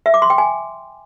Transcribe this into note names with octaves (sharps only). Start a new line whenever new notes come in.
E5
D6
C6
G5
G#5